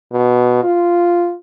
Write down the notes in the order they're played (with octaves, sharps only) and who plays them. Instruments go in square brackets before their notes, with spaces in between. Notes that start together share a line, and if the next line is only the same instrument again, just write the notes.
[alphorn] B2
F4